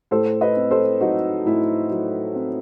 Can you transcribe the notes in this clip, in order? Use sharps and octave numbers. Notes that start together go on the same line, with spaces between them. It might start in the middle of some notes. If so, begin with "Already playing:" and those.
A2 A4 C5
B4 D#5
C4
A4 C5
F#3 D#4 F#4
A2 E4
F#3
C4